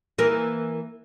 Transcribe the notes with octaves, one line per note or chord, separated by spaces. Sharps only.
E3 A#3